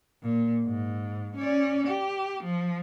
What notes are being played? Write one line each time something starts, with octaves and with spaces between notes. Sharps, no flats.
A#2
G#2
C#4 D5
G4
F3